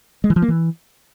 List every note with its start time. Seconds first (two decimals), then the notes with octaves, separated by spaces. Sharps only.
0.24 G#3
0.30 E3
0.36 F3
0.42 A#3
0.48 E3